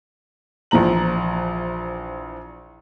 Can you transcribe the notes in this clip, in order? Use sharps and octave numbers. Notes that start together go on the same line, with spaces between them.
A#1 E3 F3 A#5 F#7